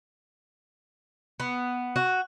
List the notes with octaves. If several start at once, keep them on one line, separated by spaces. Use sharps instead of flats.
B3
F#4